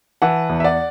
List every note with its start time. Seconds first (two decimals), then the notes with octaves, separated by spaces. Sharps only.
0.22 E3 F#5 A5
0.49 E2
0.60 E5
0.64 D5 F#5